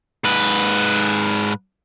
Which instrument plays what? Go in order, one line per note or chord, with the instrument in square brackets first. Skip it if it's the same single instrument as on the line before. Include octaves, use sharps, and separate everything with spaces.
[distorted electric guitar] G#2 B4